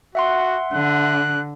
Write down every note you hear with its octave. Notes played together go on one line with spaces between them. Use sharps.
F#4 E5 F#5 C6
D3 F#6